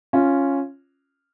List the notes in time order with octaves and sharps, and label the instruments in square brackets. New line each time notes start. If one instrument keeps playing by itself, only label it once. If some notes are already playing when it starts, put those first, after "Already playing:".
[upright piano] C#4 F4